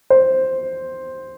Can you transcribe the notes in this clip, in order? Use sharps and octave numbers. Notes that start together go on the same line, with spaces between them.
C5